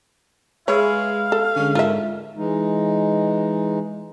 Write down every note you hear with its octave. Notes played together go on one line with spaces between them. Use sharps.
G#3 G#4 B4 C#5 E5 F5
A4
D3 G#3 C#4
G#2 G#3 F4 A4 A#4 E5
E3 G#3 D#4